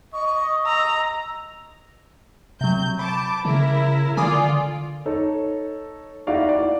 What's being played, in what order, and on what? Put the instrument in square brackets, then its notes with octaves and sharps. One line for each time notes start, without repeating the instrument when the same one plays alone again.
[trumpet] D#5 [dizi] C#6
[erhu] A#5 [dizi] E6
[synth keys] C3 F#3 [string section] G6
[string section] A5 D6 [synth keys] B5
[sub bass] C#3 [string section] E4 A#4
[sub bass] D3 [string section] F4 D5 [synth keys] G#5 D6 D#6
[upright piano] D#4 A4 C#5
D#4 E4 F#4 D5 F5
D5